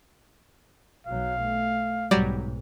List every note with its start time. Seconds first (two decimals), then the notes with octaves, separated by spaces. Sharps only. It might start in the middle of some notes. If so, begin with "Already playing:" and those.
1.07 B1 F#3 F5
1.41 A3
2.11 B1 G#2 F#3 G3 D5